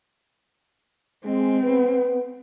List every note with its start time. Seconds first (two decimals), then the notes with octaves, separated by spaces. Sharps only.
1.25 G#3 C4
1.63 B3 B4